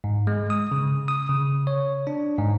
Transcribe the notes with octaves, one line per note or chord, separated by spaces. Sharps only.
G#2
G#3
D#6
C#3
D#6
C#3
C#5
D4
G#2